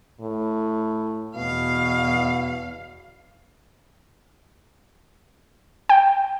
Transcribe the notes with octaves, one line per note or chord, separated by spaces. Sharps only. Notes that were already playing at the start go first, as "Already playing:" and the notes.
A2
E2 B2 F5
G5